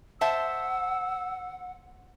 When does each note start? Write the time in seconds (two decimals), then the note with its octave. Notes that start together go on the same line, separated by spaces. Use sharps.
0.21 C5 E5 F#5 A5 E6